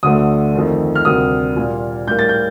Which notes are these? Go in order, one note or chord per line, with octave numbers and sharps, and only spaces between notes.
D2 D3 A3 D#6
F2 D#3 A3
F6
D2 C3 G3 A#3 D#6
A#2 G3 A#3
A2 G3 A#3 G6
A6
G6